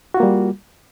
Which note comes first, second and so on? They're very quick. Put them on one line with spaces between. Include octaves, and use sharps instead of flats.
F#4 F4 A#3 G3